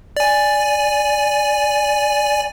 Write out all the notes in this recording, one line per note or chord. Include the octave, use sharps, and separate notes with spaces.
D5 G#5